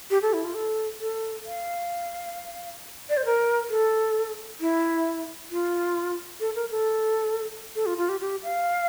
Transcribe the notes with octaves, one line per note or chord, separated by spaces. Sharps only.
G4
A4
E4
F4
A4
A4
F5
D5
C5
A#4
A4
E4
F4
A4
A#4
A4
A4
F4
F4
G4
G4
F5